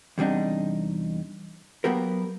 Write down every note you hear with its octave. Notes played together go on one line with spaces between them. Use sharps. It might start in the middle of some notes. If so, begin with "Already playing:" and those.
E2 C3 G3 D4 D#4
F#3 A#3 B3 G4 A#4